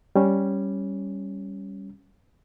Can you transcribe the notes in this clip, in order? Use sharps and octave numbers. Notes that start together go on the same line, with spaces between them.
G3 C#4